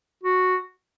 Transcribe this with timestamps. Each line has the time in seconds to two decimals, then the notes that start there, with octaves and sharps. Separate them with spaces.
0.23 F#4